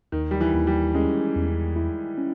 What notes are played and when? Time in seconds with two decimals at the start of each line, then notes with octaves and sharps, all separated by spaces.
0.12 D#2 D#3
0.31 G3
0.41 E3
0.54 D#2
0.67 G3
0.94 G#3 C#4
1.36 E2
1.76 E4
2.18 C#4